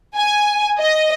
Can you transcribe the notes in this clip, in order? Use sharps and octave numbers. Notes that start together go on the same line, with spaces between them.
G#5
D#5